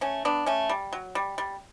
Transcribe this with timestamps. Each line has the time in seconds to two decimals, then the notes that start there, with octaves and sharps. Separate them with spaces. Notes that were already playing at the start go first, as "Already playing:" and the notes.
0.01 A3 C#4
0.25 B3 D4
0.46 A3 C#4
0.69 G3
0.93 F#3
1.15 G3
1.38 G3